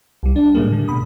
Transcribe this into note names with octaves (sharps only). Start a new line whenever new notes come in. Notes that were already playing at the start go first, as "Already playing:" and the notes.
C2 G3
D4
A2 C#3 G3 G#3 A#3
D3
B2 B5 D#6